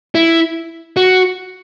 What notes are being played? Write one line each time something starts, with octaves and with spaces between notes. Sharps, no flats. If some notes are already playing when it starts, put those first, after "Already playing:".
E4
F#4